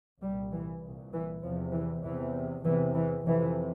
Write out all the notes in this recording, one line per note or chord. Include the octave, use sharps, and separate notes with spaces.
C2 A#2 G3
E3
C2 A#2
E3
E2 C3 F3
E3
E2 C3 E3
E2 C3 E3
E3
F2 C3 E3